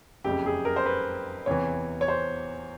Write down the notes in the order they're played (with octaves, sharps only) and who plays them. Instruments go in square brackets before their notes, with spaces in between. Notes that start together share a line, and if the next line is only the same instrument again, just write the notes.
[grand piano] F#1 F2 C#3 G4
G#4
A#4
C5
B4
E2 C3 E3 C#5
C#5
C5